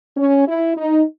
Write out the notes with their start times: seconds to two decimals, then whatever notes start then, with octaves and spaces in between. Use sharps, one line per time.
0.17 C#4
0.48 E4
0.77 D#4